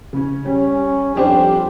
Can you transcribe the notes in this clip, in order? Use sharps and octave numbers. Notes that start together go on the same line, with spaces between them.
C#3 C#4
G3 C#4
F2 G3 D4 G4 C5